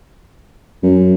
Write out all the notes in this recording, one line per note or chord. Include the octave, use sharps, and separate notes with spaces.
F#2